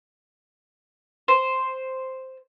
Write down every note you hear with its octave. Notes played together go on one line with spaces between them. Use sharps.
C5